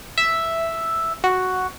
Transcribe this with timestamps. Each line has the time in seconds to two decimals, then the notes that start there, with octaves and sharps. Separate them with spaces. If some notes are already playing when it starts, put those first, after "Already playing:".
0.18 E5
1.24 F#4